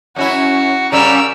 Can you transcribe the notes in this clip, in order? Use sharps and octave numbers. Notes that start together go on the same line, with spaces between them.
F#2 C#4 E4 F#4
C#3 G3 C#4 A#4 E6